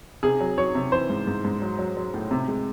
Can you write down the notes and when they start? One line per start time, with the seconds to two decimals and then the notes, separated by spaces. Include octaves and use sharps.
0.23 C3 G#4
0.40 F#3
0.58 F#3 C#5
0.75 C3
0.92 E3 C5
1.10 G#2
1.27 G#2
1.45 G#2
1.62 F#3
1.79 F#3
1.97 F#3
2.14 A2
2.31 C3
2.48 G#3